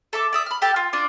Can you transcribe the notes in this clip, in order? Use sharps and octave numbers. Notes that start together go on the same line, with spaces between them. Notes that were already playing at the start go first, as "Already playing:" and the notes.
A4 E5 D6
D5 E5 D#6
B5 F6
G4 A4 A5
F4
D4 F4 D5